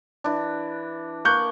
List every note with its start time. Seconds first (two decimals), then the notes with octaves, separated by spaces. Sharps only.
0.24 E3 D4
1.25 A#3 C#6 F#6 G6